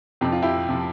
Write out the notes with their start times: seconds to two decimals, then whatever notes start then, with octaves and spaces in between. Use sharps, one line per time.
0.21 F2 C3 F3 G4
0.32 F4
0.42 E4 G4
0.69 C3 F3